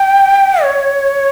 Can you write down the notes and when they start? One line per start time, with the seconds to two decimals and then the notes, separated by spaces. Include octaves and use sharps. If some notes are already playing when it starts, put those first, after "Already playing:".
Already playing: G5
0.63 C#5